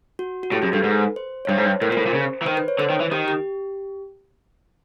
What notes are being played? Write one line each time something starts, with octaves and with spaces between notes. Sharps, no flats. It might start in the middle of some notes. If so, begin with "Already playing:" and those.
F#4
F#4
A2 G4
F#2 G#4
G2 A4
G#2 B4
C5
C#5
G2 C5
G#2
G2
A2 A#4
A#2
C5
A2
A#2 C5
C#3
E3
D#3 C5
B4
C#5
D3 C5
D#3
E3
D#3 G4
G4